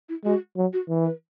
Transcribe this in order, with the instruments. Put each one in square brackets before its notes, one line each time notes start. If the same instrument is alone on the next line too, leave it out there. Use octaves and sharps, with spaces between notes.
[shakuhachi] E4
[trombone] G#3 [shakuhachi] F#4
[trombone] F#3
[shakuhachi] F#4
[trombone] E3
[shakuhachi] B4